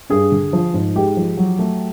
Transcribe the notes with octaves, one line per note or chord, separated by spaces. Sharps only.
G2 G#4
D3
F3
G#2
G#3 G4
F3
F#3
A3